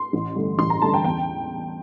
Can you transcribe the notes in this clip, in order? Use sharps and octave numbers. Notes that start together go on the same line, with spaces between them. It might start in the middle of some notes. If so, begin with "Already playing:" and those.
Already playing: C6
A1
G2 D3 A3
A1 C6
A#5
G2 D3 A3 A5
G5
E2 G5